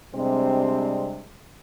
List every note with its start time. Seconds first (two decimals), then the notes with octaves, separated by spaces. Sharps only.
0.15 C3 G3 G#3 C4 D4